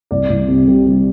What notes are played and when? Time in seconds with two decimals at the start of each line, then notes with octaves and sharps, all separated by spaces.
0.11 C2 D5
0.30 C2
0.48 C3
0.68 G3
0.87 G3